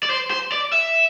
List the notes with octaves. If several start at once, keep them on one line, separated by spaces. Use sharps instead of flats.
D5
C5
C5
D5
E5